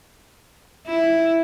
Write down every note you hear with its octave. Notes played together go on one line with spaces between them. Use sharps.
E4